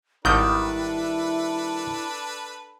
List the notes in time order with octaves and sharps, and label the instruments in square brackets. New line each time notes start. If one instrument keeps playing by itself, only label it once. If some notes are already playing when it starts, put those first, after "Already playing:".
[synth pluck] G#1 G6 [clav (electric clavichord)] D#3 G3 [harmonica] D4 A4 B4 [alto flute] E4